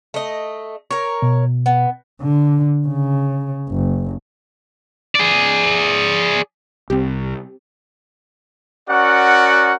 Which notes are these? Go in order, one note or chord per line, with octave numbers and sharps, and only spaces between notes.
A3 D#5
A#4 C#5
B2
B3
D3
C#3
F#1
G#4 D5
C2 C4 G4
C#4 F#4 A#4 D5 F#5